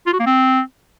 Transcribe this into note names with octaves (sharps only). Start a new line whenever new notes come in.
F4
F#4
A#3
C4